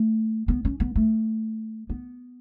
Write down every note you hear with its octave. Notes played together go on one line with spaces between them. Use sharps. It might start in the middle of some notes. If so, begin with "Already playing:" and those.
Already playing: A3
B3
C#4
B3
A3
B3